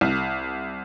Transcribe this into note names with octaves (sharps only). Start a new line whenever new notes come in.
C2